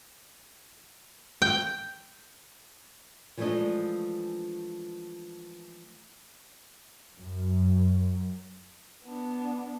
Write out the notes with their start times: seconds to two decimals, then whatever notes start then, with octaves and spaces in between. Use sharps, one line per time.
1.42 G5
3.37 E3 F3 G#3 A3 D4 D#5
7.14 F#2
9.04 B3 D4